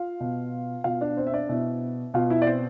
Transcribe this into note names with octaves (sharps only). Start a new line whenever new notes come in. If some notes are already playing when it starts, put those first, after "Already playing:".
Already playing: F4 F5
B2
B2 F4 F5
D4 D5
C4 C5
E5
D4 D5
B2 E4 E5
B2 F4 F5
E4 E5
D5
C4 C5